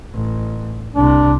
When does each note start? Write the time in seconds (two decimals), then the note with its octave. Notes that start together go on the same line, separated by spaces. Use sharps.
0.14 A1
0.96 C2 C3 D4